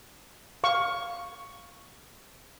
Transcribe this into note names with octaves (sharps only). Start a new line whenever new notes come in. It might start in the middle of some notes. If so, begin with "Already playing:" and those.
F5 C#6